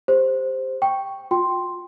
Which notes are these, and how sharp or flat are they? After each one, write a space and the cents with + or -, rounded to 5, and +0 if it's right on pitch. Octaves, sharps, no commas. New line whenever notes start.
G4 +30 C5 +0
G5 +0 C#6 +0
F4 +35 G5 -5 C6 +0